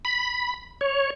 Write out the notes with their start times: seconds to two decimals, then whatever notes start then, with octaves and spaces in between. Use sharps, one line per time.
0.05 B5
0.81 C#5